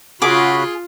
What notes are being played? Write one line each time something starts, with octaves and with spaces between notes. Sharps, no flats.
C#3 F4 F#4 G#4 B5 D6